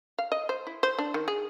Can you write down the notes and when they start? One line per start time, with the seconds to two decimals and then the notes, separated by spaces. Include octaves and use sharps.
0.19 F5
0.32 D#5
0.49 C5
0.67 E4
0.83 C5
0.99 D4
1.14 D#3
1.28 G#4